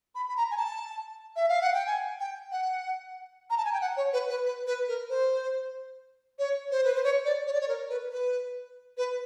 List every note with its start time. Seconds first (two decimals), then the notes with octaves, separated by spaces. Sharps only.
0.15 B5
0.29 B5
0.37 A#5
0.51 G#5
0.57 A5
1.36 E5
1.49 F5
1.61 F#5
1.74 G5
1.86 G#5
2.20 G5
2.51 F#5
3.50 A#5
3.58 A5
3.65 G#5
3.73 G5
3.81 F#5
3.97 C#5
4.13 B4
4.30 B4
4.45 B4
4.67 B4
4.88 A#4
5.09 C5
6.39 C#5
6.71 C5
6.84 B4
6.94 C5
7.03 C#5
7.25 D5
7.47 C#5
7.53 D5
7.61 C#5
7.68 A#4
7.90 B4
8.11 B4
8.97 B4